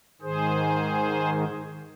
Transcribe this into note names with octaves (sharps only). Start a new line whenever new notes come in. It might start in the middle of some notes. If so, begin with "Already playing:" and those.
G#2 D#3 G#4 C5